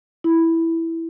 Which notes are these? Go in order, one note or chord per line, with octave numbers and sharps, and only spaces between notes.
E4